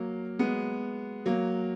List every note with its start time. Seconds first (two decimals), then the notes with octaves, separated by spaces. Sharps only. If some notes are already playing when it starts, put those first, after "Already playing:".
Already playing: F#3 A#3
0.39 G#3 B3
1.26 F#3 A#3